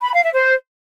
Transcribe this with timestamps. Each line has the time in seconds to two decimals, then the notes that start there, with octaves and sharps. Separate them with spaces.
0.01 B5
0.12 F5
0.23 E5
0.34 C5